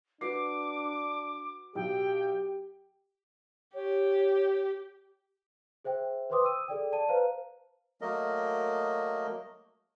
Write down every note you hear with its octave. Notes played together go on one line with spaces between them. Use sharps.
D4 F#4 B4 D6 C7
B1 G4 G5
G4 C#5
G#4 C5 E5 G5
B4 C5 G5 C6 D6 D#6
E6 D#7
G#4 A4 D5 G5
D5 A5 D#7
B4 C5 F5 A#5
F#3 A3 A#3 A#4 D#5